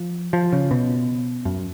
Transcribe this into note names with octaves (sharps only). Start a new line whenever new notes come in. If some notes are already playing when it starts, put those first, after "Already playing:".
Already playing: F3
F3
C#3
B2
F#2